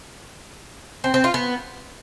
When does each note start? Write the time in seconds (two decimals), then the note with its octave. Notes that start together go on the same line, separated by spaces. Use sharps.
1.04 C4
1.14 C4
1.24 F4
1.34 B3